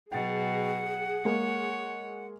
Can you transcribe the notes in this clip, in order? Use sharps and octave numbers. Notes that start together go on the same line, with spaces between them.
B2 F#3 G#4 F#5 G5 A6
G#3 A#3 C#5